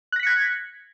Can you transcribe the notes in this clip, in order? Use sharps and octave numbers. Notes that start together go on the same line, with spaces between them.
F#6 G#6 A#6 B6 C#7